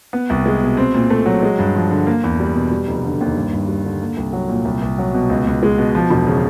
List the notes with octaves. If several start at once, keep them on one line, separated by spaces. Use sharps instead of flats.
B3
C2
G#3
B2
C4
A#2
A3
F#3
G#3
G2
F3
D3
A#3
E2
G3
B2
G3
F1
D3
D#2
G2
G2
G3
D3
A#3
C2
F#3
A#2
C2
C2
F#3
B2
C#2
C#2
G#3
B2
F3
E1
C#3